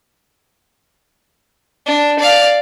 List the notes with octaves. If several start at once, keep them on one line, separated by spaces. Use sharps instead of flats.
D4
D5 F5